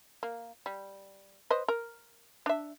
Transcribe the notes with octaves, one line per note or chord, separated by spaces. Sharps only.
A#3
G3
B4 C5 D#5
A#4
D4 E5